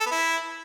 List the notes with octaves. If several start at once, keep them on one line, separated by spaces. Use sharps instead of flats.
A4
B3
E4